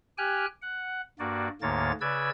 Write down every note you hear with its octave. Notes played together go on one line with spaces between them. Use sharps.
G4 G5 G#5 F6 F#6
F#5
G2 A#3 F#4 D5
D2 G#2 D3 A#3 C#5 A6
C#3 B4 D5 E6 G#6